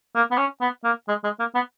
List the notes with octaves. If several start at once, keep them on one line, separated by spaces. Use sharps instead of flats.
A#3
B3
C#4
B3
A#3
G#3
G#3
A#3
B3